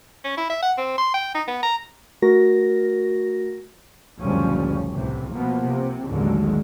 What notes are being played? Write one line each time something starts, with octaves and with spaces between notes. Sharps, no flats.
C#4
E4
E5
F#5
C4
C6
G5
D#4
B3
A#5
A3 F#4 A#4 A#6
F#1 D2 A#2 F3 G3 C#4
C2 A2 C3 E3
B2 F3 A#3 B3
C3
A1 D#2 D3 D#3 F#3 G#3